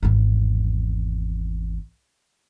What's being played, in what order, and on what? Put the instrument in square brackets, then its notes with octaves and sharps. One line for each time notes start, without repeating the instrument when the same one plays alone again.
[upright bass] G#1 E2